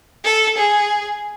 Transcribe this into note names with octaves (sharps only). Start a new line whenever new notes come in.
A4
G#4